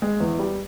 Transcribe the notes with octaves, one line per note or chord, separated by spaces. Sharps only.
G#3
E2
G3